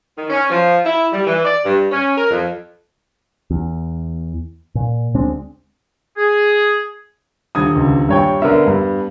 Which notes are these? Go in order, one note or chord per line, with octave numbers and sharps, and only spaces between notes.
D#3
C#4
F3
E4
G3
E3
D5
G2
C#4
A#4
F2
E2
A#2
D2 G#3 C4 D4
G#4
D#1 D3 D#6 G#6
C#2
G2 C#5 G5
D3 B3 A#4 E5
G2